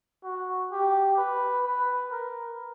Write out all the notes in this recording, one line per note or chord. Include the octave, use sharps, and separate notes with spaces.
F#4
G4
B4
B4
A#4